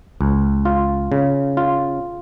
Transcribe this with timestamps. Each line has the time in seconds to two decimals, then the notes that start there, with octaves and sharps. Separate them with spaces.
0.21 C#2
0.65 F4
1.12 C#3
1.57 F4